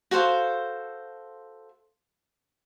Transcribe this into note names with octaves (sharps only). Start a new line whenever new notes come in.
F#4 A4 C5 F5